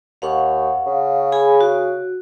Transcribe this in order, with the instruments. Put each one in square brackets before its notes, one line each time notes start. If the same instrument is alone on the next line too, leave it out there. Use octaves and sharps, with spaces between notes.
[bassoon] D#2 [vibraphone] F5 F#5 C#6
[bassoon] C#3
[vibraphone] G#4 G#5 B5
F#4